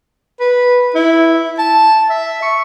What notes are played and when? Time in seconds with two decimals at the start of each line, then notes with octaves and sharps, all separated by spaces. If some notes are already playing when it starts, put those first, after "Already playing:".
0.40 B4
0.95 E4
1.59 A5
2.10 E5
2.42 C#6